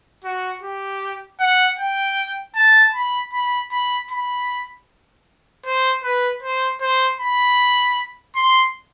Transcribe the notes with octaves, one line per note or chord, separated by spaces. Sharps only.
F#4
G4
F#5
G5
A5
B5
B5
B5
B5
C5
B4
C5
C5
B5
C6